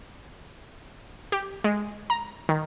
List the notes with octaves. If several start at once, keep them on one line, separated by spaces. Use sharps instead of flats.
G4
G#3
A#5
D#3